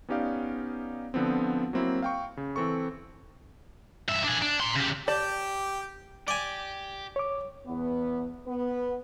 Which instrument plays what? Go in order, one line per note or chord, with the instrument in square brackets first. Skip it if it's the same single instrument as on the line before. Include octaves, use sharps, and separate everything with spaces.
[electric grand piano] B3 C#4 D#4 G4 D5 F5
D3 F3 B3 C4
F#3 A#3 C4 E4
F5 G5 C#6
C#3
E3 C4 A4 C#6
[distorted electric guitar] G2 E5
D4 G#4
D4
A#5 C6
C#3 G4
[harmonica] G4 G5 [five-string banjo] D5 A5
[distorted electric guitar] G4 [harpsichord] D5 G#5
[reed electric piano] C#5 D6
[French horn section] E2 B3
B3 B4